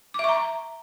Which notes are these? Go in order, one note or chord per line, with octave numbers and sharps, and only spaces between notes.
E5 A#5 C#6 D6